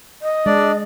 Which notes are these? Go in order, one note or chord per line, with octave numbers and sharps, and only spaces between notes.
D#5
G#3 D4 D5